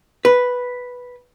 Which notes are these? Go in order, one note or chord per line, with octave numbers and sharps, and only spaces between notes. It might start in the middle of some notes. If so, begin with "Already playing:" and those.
B4